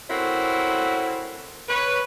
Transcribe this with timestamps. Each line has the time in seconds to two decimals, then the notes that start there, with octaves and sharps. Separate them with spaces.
0.09 C4 C#4 E4 F#4 A4 A#4
1.68 B4 C#5